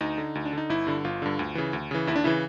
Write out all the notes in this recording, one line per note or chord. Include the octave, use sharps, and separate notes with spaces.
D2 D#4
D3
D2
D4
D3 D#4
G1 E4
G2 D3
G1 F4
G2 D3
D2
C#3 E3
D2
C#3 E3
D#2 E4
D4
C#3 E3 E4